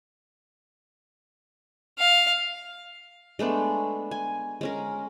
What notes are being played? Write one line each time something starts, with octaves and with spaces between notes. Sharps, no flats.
F5
G#3 A3 B3 D4
G#5
G#3 C#4 A#4